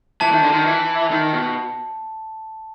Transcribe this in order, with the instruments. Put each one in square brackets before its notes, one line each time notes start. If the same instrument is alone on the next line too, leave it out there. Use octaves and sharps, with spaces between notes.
[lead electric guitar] E3 [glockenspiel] A5
[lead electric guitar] D#3
D3
D#3
E3
D#3
B2